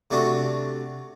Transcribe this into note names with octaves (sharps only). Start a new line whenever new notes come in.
C3 A3 D4 F#4